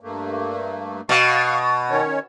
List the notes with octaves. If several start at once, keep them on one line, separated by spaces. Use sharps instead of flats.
G2 A3 A#3
B2 F5 C#6
D#3 C#4 C#5